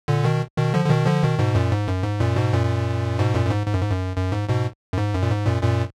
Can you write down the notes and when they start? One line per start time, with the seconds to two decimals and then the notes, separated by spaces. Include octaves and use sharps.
0.08 A#2 D3
0.24 B2 D#3
0.57 B2 D#3
0.74 D3 F3
0.85 D3
0.90 B2 D#3
1.06 D3 F3
1.23 B2 D#3
1.39 G#2 B2
1.55 F#2 A#2
1.72 G#2
1.87 F#2
2.04 G#2
2.20 F#2 A#2
2.36 G#2 B2
2.53 F#2 A#2
3.19 G#2 B2
3.35 F#2 A#2
3.46 F#2
3.51 G#2
3.67 G#2
3.74 F#2
3.81 G#2
3.91 F#2
4.16 F#2
4.32 G#2
4.49 G#2 B2
4.93 F#2
4.98 G#2
5.14 F#2
5.23 A#2
5.30 G#2
5.46 F#2 A#2
5.62 F#2 A#2